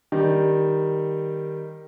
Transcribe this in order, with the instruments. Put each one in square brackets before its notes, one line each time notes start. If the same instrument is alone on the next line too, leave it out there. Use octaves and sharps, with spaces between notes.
[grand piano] D#3 G3